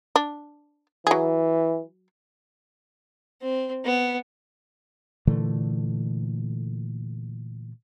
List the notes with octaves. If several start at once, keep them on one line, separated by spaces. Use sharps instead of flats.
D4
E3 F#3 G#4
C4
B3
A#2 D3 E3 A3